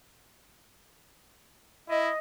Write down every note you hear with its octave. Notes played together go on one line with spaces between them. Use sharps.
E4 D#5